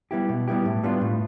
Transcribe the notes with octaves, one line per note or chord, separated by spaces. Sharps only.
G3 B3 E4 G4
B2
G3 B3 E4 G4
A2
G3 B3 D4 F4
A2